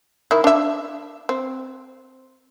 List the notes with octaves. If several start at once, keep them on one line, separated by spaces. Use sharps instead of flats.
D#3 E4
D4 E5
C4